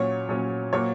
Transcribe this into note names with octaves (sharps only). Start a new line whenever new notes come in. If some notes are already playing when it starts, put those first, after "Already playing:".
Already playing: A#2 F#3 C#4 C#5
A#2 F#3 C#4
A#2 F#3 A#3 C#5